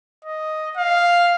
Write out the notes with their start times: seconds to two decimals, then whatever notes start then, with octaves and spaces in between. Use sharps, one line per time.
0.25 D#5
0.77 F5